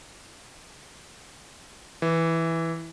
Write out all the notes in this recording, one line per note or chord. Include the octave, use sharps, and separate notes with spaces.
E3